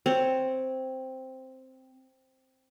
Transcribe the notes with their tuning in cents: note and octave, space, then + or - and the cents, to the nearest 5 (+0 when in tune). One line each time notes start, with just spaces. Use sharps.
C4 +0 C#5 +0